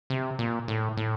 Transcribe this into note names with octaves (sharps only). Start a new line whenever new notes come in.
C3
A#2
A2
A2